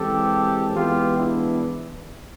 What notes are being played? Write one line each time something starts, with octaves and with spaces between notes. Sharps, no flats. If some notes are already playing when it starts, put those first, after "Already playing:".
Already playing: E3 G#3 C4 G4 A4
E3 G#3 B3 F4 G4
D4 E4